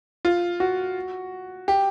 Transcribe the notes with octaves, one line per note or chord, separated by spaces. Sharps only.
F4
F#4
G4